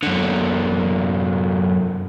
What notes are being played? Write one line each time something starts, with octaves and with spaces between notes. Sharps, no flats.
F#2 D3